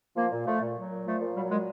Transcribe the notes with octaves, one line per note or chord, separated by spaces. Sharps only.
F3 A#3
A#2
F3 A3
A#2
F#3
A#2
F3 A3
A#2
F#3 G3
A#2 G#3